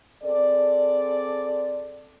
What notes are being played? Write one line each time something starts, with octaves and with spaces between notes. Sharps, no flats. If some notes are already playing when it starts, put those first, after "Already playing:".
C4 G#4 A4 D5